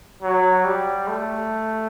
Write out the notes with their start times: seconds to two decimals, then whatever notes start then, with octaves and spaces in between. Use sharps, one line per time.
0.22 F#3
0.64 G3
1.08 A3